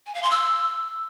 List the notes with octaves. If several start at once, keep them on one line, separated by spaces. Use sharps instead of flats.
G#5
F5
C6
E6